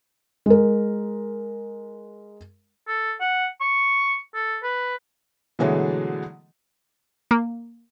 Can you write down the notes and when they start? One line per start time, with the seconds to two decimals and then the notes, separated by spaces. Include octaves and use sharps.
0.46 G#3 A#4
2.88 A4
3.21 F#5
3.61 C#6
4.35 A4
4.63 B4
5.59 B2 D3 E3 F#3 G#3 A3
7.31 A#3